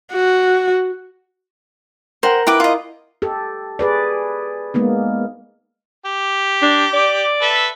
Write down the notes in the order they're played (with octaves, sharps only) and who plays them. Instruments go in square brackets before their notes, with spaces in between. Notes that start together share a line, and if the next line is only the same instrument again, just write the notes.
[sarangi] F#4
[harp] A#4 F#5 G5 [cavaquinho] C5
[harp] E4 [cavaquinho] B4 G5 D6
[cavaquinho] F4 D#5
[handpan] G4 A4
G#4 B4 D5
G#3 A#3 B3 D#4
[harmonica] G4
[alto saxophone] D4
D5
[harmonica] A4 B4 E5